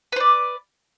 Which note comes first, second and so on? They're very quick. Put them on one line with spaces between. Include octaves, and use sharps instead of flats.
B4 C5 D5